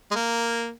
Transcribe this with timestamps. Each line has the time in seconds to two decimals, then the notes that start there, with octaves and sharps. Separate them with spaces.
0.11 G#3
0.15 A#3